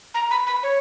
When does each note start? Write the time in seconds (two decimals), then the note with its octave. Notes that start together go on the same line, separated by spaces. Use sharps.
0.14 A#5
0.31 B5
0.47 B5
0.63 C#5